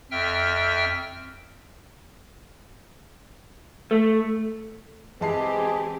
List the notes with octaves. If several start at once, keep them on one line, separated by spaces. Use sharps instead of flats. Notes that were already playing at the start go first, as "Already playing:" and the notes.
F2 E5 G5 F6
A3
E3 G#3 C4 G4 G#4 A5 C7